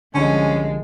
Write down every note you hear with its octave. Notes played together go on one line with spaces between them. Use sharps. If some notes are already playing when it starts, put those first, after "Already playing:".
C2 D3 F3 G#3 C#4